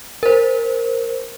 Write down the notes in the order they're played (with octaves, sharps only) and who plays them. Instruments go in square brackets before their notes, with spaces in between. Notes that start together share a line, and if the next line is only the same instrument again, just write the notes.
[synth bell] A#4 C5